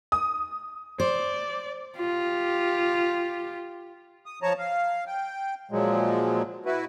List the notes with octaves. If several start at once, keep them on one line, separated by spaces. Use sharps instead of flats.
D#6
C5 D5
F4 G4
D#6
F3 C#5 A5 A#5
F5
G5
A#2 F3 F#3 G#3
E4 F#4 B4